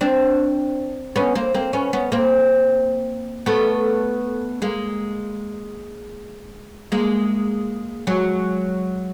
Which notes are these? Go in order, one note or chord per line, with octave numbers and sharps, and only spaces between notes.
C4 D4
B3 C#4
A#3 C4
A#3 C4
B3 C#4
B3 C#4
A#3 C4
A3 B3
G#3 A#3
G#3 A#3
F#3 G#3